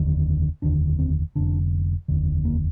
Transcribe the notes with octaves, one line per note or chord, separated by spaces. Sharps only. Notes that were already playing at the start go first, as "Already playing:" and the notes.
Already playing: F1 D#2 D3
F1 D#2 D3 D4
C4
F1 D#2 D3 D4
F1 D#2 D3
A#3